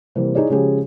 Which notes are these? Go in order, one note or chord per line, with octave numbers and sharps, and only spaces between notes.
C3 E3 G3 A#3
D#4 E4 G#4 C#5 D5
C#3 F3 G#3 C#4 G4 G#4